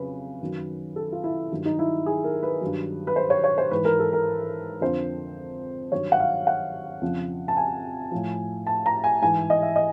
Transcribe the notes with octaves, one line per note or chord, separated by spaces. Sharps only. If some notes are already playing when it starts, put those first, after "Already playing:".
Already playing: F2 C#3 F#3 B4
F#2 D#3 F#3
A4
F4
E4
G2 D#3 F#3
D#4
E4
G#4
A#4
B4
G2 D#3 F#3
B4
C5
C#5
C#5
C5
G#2 E3 B4
A#4
A4
A#4
F2 D3 F3 C5
G2 D#3 F#3 C#5
F#5
F5
F#5
F2 C#3 F3
A5
G#5
A2 F3
A5
A#5
G#5
G#2 E3 G#5
D#5
E5
D#5